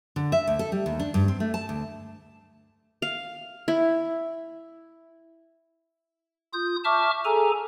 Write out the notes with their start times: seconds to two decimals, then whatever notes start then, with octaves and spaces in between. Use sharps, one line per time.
0.16 D3
0.32 E5
0.47 D2
0.59 A4
0.72 G3
0.86 D#2
1.00 D4
1.14 G2
1.28 C4
1.40 A3
1.54 A5
1.69 D2
3.02 F5
3.68 E4
6.53 F4 D#6 G6
6.84 E5 A5 C#6 D6 F6
7.25 G#4 A4 G#5 A#5